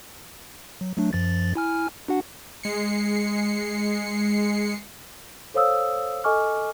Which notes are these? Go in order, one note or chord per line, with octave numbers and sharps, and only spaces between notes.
F#3
F#3 A3 D4
F#2 F3 A6
E4 G#5 F6
D4 F#4 F#5
G#3 C7 C#7
A4 C5 C#5 F5 D#6 E6
A4 D#5 G#5 C#6 D6 F6